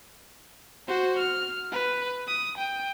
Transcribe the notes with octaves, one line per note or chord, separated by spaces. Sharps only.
F#4 C5
F6
B4
D#6
G5